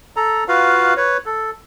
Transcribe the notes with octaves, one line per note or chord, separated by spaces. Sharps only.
A4 A#5
F4 F#4 B4 F5
B4 C#5
A4